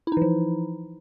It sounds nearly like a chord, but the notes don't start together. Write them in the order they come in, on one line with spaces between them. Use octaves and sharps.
E4 D#4 E3 F3